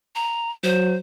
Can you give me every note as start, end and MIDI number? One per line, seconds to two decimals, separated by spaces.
0.15 0.50 82
0.64 0.97 54
0.64 0.95 72